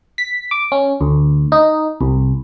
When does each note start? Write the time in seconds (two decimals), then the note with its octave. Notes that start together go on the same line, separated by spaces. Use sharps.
0.18 B6
0.51 D6
0.72 C#4
1.01 D2
1.52 D#4
2.01 C2